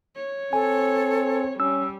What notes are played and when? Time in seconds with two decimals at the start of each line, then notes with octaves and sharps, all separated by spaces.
0.16 C#5
0.53 C4 A4 G#5
1.60 G3 C#4 E6